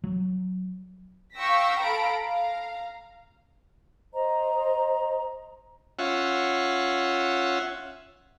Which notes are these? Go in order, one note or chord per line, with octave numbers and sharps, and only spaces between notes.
F#3
F5 G5 C#6 E6 A#6 B6
A4 F5 A#5 B5 D7
F5 A#5
C5 D#5 A#5
C#4 F4 E5 F#5